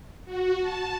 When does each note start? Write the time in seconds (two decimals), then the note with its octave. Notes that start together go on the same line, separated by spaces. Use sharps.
0.25 F#4
0.60 A5